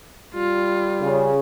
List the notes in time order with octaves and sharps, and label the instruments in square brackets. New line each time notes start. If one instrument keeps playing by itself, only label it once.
[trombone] G3 [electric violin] F4
[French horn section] C#3